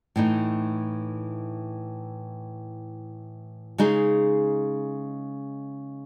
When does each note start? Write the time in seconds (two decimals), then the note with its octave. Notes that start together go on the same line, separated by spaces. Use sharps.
0.16 A2 E3 A3 D#4
3.78 C#3 G#3 D#4 G#4